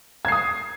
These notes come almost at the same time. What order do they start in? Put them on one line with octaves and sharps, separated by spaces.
G#6 C7 D#6